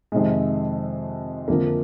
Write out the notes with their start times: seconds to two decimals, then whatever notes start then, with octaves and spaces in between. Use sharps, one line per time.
0.12 F2 C3 D#3 G#3
1.48 F2 D3 F3 A#3